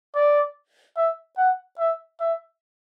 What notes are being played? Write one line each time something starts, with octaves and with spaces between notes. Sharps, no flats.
D5
E5
F#5
E5
E5